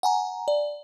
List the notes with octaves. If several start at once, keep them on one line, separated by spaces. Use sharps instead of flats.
F#5 G#5 A#5
D5